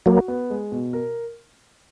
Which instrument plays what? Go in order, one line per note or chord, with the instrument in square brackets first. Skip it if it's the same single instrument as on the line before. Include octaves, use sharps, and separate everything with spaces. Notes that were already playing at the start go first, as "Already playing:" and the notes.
[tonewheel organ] F#3 A#3 [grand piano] F#4
[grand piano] B3
G#3
B2
A#4